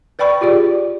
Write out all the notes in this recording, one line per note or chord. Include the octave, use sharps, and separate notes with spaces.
B4 D5 G5 B5 C#6
F4 G4 G#4 D5